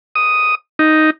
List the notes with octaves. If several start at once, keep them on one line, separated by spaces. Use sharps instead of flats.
D#6
D#4